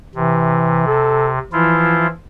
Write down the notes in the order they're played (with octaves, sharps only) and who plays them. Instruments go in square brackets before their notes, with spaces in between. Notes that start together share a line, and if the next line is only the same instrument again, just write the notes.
[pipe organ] C3 [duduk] E3
[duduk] A4
[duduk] E3 [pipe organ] F3 E4 F4